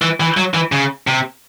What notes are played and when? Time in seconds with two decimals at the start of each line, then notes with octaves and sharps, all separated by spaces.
0.02 E3
0.20 E3
0.37 F#3
0.54 E3
0.72 C#3
1.07 C3